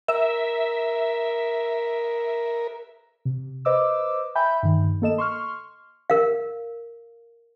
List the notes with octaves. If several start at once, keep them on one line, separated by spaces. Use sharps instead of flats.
A#4 E5
C3
B4 C5 D#5 D6 E6
E5 G5 G#5 B5 G6
G2 D#3
A#3 A4 D#5 E7
C6 C#6 F6
A#4 F5